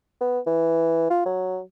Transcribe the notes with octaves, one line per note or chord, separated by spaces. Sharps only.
B3
E3
F4
F#3